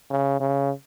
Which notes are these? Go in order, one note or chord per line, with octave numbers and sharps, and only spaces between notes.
C#3
C#3